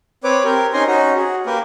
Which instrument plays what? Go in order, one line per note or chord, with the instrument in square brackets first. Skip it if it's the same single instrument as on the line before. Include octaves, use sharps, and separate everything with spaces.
[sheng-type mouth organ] C4 B4 C#5 D6
C4 G4 A#4
C#4 D#4 G#5 A#5 C6
C#4 D#4 F#4 A#5
F#4 G#4
A#3 G4 A#4 B4